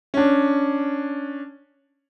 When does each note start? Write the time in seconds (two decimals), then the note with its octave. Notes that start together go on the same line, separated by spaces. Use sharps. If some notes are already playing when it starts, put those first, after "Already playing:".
0.14 C#4 D4